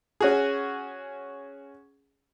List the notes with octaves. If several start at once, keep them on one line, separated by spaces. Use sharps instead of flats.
C#4 F#4 G#4